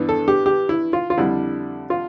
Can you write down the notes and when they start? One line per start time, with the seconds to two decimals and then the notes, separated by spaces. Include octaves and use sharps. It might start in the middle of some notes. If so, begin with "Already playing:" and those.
Already playing: G2 E3 B3 D4
0.09 A4
0.28 G4
0.46 G4
0.69 E4
0.93 F4
1.10 F4
1.18 F2 D3 G3 D4 E4
1.90 F4